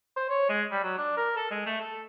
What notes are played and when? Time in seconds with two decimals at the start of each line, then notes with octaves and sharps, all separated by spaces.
0.17 C5
0.30 C#5
0.49 G#3
0.71 G3
0.83 F#3
0.98 D4
1.17 A#4
1.36 A4
1.51 G#3
1.66 A3
1.80 A4